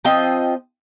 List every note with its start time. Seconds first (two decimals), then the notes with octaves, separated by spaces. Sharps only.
0.05 F3 C4 D#5 G5